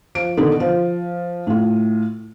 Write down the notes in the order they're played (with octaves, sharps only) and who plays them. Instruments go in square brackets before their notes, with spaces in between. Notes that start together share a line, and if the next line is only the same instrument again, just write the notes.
[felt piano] F3 D7
B2 D3 D#3 B3
F3
A2 F4